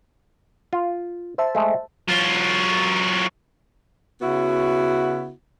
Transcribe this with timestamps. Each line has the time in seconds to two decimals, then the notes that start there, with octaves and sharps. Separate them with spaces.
0.73 F4
1.38 C5 E5 A5
1.55 G#3 A3
2.08 F#3 F4
4.22 C#3 B3 E4 F#4